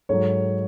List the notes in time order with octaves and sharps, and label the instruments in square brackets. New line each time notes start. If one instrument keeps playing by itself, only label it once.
[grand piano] G#2 F#3 A4 C#5